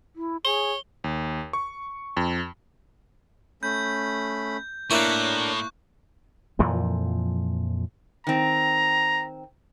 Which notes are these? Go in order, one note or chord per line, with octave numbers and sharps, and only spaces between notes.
E4
G#4 C#5 G7
D#2
C#6
F2
A3 C#4 B5 G6
A2 A#3 D4 E4 A#4 C#5 C#6 F#6
F2 A#2 E3 F3
D#3 C4 A#5